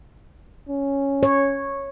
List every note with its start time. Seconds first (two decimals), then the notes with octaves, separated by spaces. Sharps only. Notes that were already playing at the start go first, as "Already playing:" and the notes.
0.69 C#4
1.23 C#5